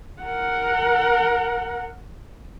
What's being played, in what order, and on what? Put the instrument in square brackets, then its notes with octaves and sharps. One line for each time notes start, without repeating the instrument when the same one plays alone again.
[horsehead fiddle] A#4 F#5